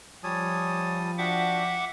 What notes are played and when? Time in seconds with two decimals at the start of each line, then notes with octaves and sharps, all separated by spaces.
0.24 F3 G3 C#5 G#5 A5 D#6
1.18 D4 F#4 E5 F#5 G5 D6